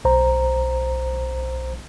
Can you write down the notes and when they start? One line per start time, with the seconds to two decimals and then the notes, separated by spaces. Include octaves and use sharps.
0.05 B1 C5 A#5